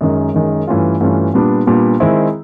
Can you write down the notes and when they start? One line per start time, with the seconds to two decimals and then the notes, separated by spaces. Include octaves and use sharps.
0.01 F#2 D#3 G#3
0.34 F#2 D#3 G#3
0.67 G2 E3 A3 C#4 F4
1.00 G2 E3 A3 C#4 F4
1.34 A#2 G3 B3 D4
1.66 A#2 G3 B3 D4
2.00 D#3 G#3 C4 E4